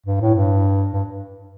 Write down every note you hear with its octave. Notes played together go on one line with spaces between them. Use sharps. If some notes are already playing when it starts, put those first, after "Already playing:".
G2
A2
G2
G2